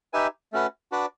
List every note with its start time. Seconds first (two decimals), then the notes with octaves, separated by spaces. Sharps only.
0.13 D#4 G4 B4 E5 G#5
0.52 A3 C#4 F#4 B4
0.92 D4 F#4 B4 D5